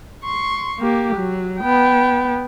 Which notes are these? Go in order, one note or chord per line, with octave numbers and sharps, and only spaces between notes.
C6 C#6
A#3 G4
F#3
B3 G5